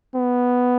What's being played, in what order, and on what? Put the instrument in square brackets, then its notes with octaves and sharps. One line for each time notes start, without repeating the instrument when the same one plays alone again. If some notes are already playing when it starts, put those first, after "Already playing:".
[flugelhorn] B3